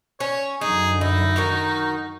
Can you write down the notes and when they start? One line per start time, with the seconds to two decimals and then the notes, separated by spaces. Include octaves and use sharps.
0.20 C#4 C#5
0.61 F#2 D3 D#4 G#4
1.01 D#4 E4
1.36 D#3 F#4 A#4